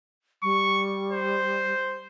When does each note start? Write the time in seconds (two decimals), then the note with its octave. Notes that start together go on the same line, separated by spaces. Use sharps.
0.43 G3 C#6
1.11 C5